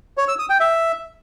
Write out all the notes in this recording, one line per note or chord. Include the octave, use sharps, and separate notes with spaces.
C#5
E6
D#6
G5
E5